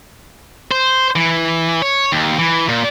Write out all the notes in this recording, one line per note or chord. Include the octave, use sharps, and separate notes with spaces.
C5
E3
C#5
D#2
E3
A#2